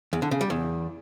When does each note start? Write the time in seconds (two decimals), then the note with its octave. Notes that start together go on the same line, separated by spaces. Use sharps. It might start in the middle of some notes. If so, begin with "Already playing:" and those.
0.13 E2
0.22 D3
0.31 C#3
0.41 G3
0.50 E2